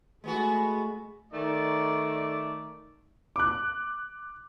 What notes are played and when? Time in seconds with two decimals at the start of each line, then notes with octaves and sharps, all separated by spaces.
0.24 G#3 A3 B3 F#4
1.32 D#3 A3 D5
3.36 D6 F#6